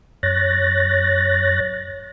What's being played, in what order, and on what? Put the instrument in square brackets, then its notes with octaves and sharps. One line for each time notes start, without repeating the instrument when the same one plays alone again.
[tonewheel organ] F#2 C#5 F#6 A6 A#6